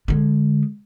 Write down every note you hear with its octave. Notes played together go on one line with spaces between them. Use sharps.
D3 G#3